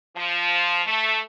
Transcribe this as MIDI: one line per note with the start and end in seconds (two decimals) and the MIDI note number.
0.16 0.81 53
0.86 1.19 57